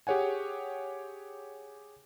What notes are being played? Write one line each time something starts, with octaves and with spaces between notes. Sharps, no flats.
G4 G#4 C#5 F#5 G#5